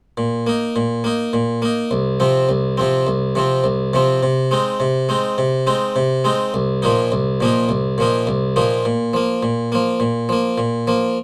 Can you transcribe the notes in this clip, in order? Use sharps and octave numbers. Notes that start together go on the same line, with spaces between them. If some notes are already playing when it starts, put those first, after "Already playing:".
A#2
A#3 D#4
A#2
A#3 D#4
A#2
A#3 D#4
C2
C3 F3 C4
C2
C3 F3 C4
C2
C3 F3 C4
C2
C3 F3 C4
C3
G#3 C4 D#4
C3
G#3 C4 D#4
C3
G#3 C4 D#4
C3
G#3 C4 D#4
C2
A#2 F3 A#3 D#4
C2
A#2 F3 A#3 D#4
C2
A#2 F3 A#3 D#4
C2
A#2 F3 A#3 D#4
A#2
F3 A#3
A#2
F3 A#3
A#2
F3 A#3
A#2
F3 A#3